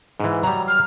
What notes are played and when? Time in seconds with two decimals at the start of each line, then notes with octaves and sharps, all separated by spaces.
0.20 G#2 E3
0.43 F#3 G3 A#5
0.68 F6